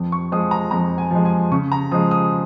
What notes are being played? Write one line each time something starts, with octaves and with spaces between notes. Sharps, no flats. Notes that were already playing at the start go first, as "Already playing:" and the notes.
Already playing: F2
C#6
F3 G#3 D#6
A#5
F2 A#5
G#5
F3 G#3
G#5
C#3 C#6
A#5
F3 G#3 D#6
D#6